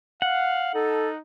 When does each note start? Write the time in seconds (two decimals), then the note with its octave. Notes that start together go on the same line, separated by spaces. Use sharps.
0.22 F5 F#5
0.74 D#4 A4